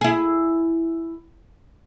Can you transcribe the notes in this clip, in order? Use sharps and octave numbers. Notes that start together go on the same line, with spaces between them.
E4 G#4